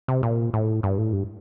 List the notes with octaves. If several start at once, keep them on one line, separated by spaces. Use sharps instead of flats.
C3
A#2
A2
G2
A2
G2